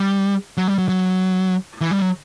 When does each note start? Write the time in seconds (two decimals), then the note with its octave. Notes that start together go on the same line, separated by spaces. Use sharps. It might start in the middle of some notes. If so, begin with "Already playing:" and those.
Already playing: G3
0.57 F#3
0.68 G3
0.78 F#3
0.89 F#3
1.81 E3
1.91 G3
2.01 F#3